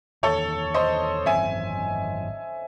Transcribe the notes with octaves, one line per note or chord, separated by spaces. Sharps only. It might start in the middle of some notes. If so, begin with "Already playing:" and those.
E1 E2 D#3 A4 C#5
C5 D#5
G#1 F#2 E3 C4 E5 G#5